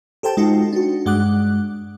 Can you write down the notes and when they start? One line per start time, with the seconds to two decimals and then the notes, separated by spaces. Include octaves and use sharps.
0.23 G4 A4 C5 G5 A5
0.37 G#3 D#4 F4 F#4
0.73 D4 F#4
1.06 G2 G#3 F#5 D6 F#6